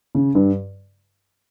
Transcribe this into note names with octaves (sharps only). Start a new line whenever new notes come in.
C#3
G2